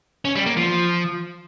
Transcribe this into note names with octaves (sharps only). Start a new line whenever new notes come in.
C#4
G3
A#3
F3